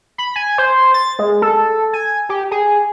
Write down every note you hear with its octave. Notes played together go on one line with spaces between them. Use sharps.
B5
G#5
C5
A6
G#3
A4
G#5
G4
G#4